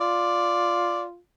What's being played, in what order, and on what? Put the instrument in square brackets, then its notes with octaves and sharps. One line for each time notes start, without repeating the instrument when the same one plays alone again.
[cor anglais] F4 [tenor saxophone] D5